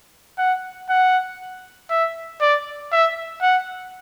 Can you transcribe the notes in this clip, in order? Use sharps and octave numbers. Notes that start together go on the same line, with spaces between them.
F#5
F#5
E5
D5
E5
F#5